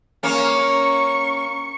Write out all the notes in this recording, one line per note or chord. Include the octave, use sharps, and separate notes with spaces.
A#3 C#4 C#6